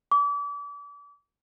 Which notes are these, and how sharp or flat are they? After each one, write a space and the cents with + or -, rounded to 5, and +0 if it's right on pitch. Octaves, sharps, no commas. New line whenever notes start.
D6 -35